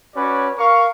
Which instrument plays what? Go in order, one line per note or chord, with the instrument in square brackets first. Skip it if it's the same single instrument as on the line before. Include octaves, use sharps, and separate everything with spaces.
[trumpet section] C#4 F#4 B4 C#5 D5
A#4 F5 C#6